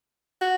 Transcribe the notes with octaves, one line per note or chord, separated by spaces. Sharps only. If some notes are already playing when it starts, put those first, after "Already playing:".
F#4